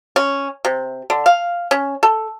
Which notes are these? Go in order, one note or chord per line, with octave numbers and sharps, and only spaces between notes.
C#4
C3
D3
F5
C#4
A4